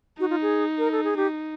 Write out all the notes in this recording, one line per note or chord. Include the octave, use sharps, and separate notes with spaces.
D#4 F#4
F4
G#4
A#4
A4
G#4
D#4 G4